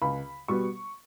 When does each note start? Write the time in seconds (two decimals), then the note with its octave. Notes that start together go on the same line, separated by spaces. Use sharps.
0.02 C#2 B5
0.48 B2 G3 B3 C#6